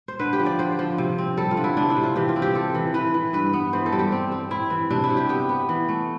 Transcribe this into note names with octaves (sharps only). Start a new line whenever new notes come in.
C5
D3 B4
G4
F3
D5
D3 C5
F3
C3
C4
G3 A4
F4
D3
E4
C3 D4
E4
C3
F4
E3 G4
F4
C4
G4
C4 A4
E3
E3 B4
E3
G2 B4
B3
E3 C5
A4
G3
G4
C4
C4
C4 E4
E3
C3 D4
E4
C3
G4
B3 G4
B3
E3
A3